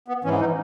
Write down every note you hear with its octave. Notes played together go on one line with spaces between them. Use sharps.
B3
G#2 E3 C#4
D#4